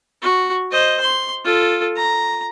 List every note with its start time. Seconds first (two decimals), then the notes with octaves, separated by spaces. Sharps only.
0.22 F#4
0.71 C5 D#5
1.00 C6
1.45 F4 A4
1.96 A#5